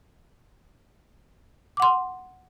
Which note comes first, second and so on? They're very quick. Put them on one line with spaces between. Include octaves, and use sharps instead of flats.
D6 F#5 C6